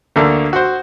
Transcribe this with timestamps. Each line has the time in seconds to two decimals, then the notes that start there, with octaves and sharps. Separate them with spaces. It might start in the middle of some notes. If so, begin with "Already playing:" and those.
0.16 D2 D3 A#3
0.53 F#4 C5